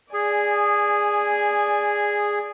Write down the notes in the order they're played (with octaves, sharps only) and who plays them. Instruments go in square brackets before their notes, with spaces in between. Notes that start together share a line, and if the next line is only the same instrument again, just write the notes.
[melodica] G#4 [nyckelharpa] D5 G#5